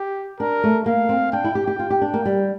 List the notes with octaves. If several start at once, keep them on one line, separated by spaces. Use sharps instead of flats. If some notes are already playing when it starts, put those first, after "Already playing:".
Already playing: G4
D4 A#4
A3
A#3 F5
C4
D4 G5
E4
G4
G4
F4
G4
D4
A#3
G3